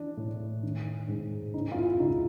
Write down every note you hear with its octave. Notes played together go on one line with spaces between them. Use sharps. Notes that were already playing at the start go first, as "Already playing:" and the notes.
Already playing: E3 D4
A2
D#3
G#2
C#3 D#4
F4
E4
C#2 D#4